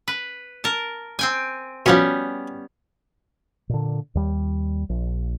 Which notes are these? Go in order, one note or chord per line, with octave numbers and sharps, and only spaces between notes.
B4
A#4 A5
C4 G5 G#5
B2 F3 G3 B3 C#4
A#2 D3
D#2 G3
A#1